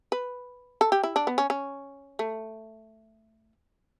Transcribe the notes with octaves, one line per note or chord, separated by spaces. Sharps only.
B4
A4
G4
E4
D4
B3
C#4
C#4
A3